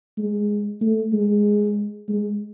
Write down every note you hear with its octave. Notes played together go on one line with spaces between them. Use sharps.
G#3
A3
G#3
G#3